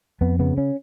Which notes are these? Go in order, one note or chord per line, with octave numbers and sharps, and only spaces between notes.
F2 B3
C#3 B3
C#4